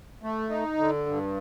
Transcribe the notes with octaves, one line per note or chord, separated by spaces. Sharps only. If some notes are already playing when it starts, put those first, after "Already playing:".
A3
D#4
D3
G2